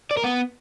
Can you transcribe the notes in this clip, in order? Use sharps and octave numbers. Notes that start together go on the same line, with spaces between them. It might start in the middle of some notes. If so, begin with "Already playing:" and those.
D5
A#4
B3